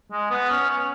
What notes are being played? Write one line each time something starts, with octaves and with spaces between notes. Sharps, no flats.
G#3
B3
C#4
C#4